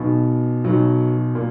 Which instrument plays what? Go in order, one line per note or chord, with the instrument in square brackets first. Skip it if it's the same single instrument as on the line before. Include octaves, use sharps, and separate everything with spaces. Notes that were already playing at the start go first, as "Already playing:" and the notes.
Already playing: [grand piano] B1 B2
B1 B2 F#3
A#2